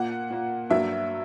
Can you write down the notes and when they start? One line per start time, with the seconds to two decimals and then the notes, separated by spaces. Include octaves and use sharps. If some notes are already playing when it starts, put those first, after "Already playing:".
Already playing: A#2 A#3 F#5
0.30 A#2 A#3
0.70 G2 F#3 A#3 E5